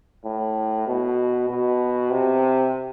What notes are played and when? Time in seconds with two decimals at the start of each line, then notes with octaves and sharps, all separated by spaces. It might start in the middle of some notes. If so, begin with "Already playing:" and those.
0.25 A2
0.87 B2
1.49 B2
2.11 C3